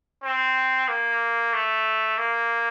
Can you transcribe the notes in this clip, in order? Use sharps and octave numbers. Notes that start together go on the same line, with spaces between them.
C4
A#3
A3
A#3